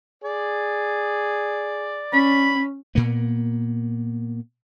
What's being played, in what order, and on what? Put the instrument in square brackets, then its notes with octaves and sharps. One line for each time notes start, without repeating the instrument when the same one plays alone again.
[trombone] G#4 [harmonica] D5
[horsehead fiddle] C#4 [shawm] B5
[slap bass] A#2 A#3 B3